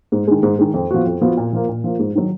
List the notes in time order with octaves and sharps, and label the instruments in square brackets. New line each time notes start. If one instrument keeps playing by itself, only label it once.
[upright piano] G#2
D#3 G#3
G#2
D#3 G#3
F2
F3 B3 F#4
F2
F3 B3 F#4
A#2
F3 A#3
A#2
F3 A#3
G#2
D#3 F#3